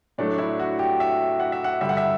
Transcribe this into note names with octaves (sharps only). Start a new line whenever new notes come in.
A2 F#3 A3 D4
E4
F#4
G4
E5
F#5
E5
F#5
G2 D3 G3 E5
F#5
E5